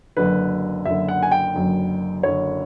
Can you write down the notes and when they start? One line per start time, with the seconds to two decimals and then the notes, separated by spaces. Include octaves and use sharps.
0.17 F#1 F#2 D3 B4
0.85 F#1 F#2 D3 E5
1.08 F#5
1.23 G#5
1.32 G5
1.54 F#1 F#2 D3
2.23 F#1 F#2 D3 C#5